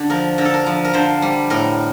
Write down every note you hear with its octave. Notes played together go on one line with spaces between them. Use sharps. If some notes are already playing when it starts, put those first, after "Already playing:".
Already playing: D3 G4
F3 A#4
D3 A#4
A4
A#4
F3
A#4
D3 C5
G3
A2 A#4